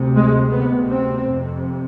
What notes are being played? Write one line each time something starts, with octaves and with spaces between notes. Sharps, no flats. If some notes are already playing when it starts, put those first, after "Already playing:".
Already playing: D2 C3
G#3
D2 C3 B3
C4
F2 C3